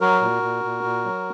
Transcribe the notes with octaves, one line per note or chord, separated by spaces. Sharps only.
F#3 F#4 A#4
A#2
A#2
A#2
A#2
F#3